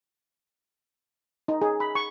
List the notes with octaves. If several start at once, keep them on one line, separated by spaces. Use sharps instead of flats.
D#4
G#4
B5
C#6